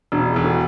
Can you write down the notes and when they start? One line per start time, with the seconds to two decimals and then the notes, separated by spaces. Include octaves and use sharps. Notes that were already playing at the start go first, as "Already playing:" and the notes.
0.12 E1 D4 F#4
0.29 E4 G#4
0.36 E1
0.45 F#4 A4